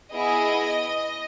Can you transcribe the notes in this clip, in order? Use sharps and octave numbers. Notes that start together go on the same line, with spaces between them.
B3 E4 G#4 D#5